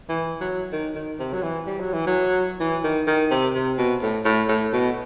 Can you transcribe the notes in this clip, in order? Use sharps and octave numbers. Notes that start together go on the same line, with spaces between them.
E3
F#3
D#3
D#3
C3
F#3
E3
G3
F#3
E3
F#3
E3
D#3
D#3
C3
C3
B2
A2
A2
A2
B2